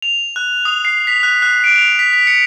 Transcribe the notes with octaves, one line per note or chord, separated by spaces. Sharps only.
F7
F#6
D#6
C7
B6
F#6
F#6
D7
F7
B6
B6
C#7